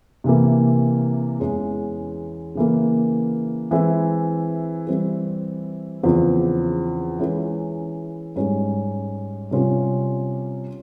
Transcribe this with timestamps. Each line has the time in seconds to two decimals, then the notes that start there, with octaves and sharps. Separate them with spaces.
0.24 C3 E3 A#3
1.40 E2 E3 G#3 C#4
2.55 C#3 E3 A#3
3.71 E3 G#3 C4 E4
4.87 E3 G3 C4 E4
6.03 E2 C#3 F3 C4 F4
7.19 E3 G#3 C#4 E4
8.36 G#2 G3 C#4
9.51 C3 G3 C#4 F4